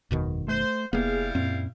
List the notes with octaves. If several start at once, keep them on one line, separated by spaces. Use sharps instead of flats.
F#1 E2 B2 D#3
A3 C5
F1 G3 A#3 B3 E4 G#4 F5
F#2 A#2 C4